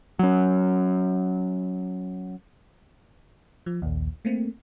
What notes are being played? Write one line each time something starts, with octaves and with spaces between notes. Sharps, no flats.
F#3 C#4
F3
A#1 D#2
A3 A#3 C4